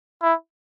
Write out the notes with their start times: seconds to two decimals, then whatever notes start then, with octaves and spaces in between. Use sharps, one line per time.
0.22 E4